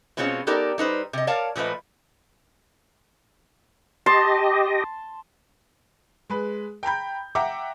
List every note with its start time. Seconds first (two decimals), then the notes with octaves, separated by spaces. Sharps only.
0.17 B2 G#3 C4 C#4 F4 C#5
0.47 B3 D#4 G4 A4 A#4 D5
0.78 G3 D#4 B4 C5
1.13 C3 D#5
1.27 A#4 C#5 D5 F5 A5
1.56 A#2 F3 A3 B4 D#5
4.06 G4 D#5 A5 C6
6.30 G#3 B4
6.83 G5 A#5 B5 G6
7.35 E5 F#5 G5 A#5 D6